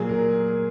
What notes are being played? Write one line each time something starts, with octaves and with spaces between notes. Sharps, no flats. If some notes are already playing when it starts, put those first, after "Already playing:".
Already playing: A#2 F#3 G#4
A#4